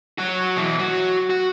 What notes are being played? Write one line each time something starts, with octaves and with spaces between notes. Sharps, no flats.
F#3 F#4
B2 E3
F#3 F#4
F#4